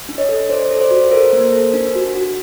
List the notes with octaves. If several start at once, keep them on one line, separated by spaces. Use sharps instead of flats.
D4
C#5 D#5
A4
A4 C5 D5
A4
C5 D5
F#4
A4 A#4 C5
A#3
A4
D4
F#4
F#4